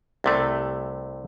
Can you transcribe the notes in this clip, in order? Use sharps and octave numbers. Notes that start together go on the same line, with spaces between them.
C2 C3 A3